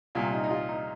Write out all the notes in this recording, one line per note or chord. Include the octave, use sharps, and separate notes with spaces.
C2 A#2 F4
D#4
D#4
F4
D#4